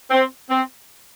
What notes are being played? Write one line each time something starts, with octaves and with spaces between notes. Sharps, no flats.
C4
C4